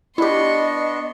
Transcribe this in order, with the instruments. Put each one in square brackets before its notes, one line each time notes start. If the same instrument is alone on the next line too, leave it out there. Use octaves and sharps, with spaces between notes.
[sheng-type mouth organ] B3 D4 [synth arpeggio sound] E4 G4 [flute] D#5 [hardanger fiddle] C6 C#6